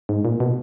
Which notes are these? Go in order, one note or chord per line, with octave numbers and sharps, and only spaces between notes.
G#2
A#2
B2